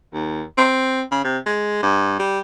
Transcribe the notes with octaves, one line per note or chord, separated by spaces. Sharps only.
D#2
C4
C#3
C3
G#3
G2
G3